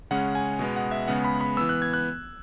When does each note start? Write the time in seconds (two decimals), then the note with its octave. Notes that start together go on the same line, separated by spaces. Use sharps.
0.11 C#3 G#3 C#4 F#5
0.35 G#5
0.59 B2 G#3 B3
0.76 F#5
0.91 E5
1.08 C#3 G#3 B3 F#5
1.25 B5
1.41 B5
1.57 E3 B3 E6
1.69 F#6
1.82 G#6
1.93 F#6